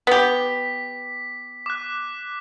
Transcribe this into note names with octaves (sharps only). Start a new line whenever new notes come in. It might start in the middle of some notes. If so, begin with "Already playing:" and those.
B3 G4 B6
D6 F#6